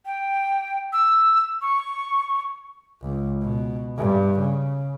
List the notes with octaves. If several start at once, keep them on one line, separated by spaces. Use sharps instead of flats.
G5
E6
C#6
C#2
B2
G2
C#3